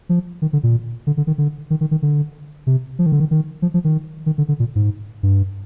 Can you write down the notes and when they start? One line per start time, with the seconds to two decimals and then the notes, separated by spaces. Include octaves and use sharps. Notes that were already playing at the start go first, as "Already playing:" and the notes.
0.09 F3
0.42 D#3
0.53 D3
0.63 A#2
1.07 D3
1.17 D3
1.27 D#3
1.38 D3
1.70 D#3
1.81 D#3
1.91 D#3
2.02 D3
2.67 C3
2.99 F3
3.06 D#3
3.12 D3
3.20 D#3
3.31 D#3
3.62 F3
3.74 F3
3.84 D#3
4.26 D#3
4.38 D3
4.48 D3
4.60 A#2
4.75 G#2
5.23 G2